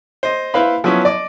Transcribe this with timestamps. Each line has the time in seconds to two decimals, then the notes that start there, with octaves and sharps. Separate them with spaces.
0.23 C5 D#5
0.54 E4 B4 C5 F5 B5
0.84 F3 F#3 B3 C#4 E4
1.05 D5 D#5 D6